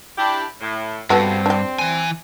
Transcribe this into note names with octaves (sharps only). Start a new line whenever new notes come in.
D4 E4 G4
A2
G2 B3 C4 F#4 A4
D4 G4
E3 G#5